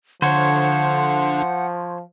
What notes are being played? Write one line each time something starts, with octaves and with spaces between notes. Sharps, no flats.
D3 F3 C5 C#5 F#5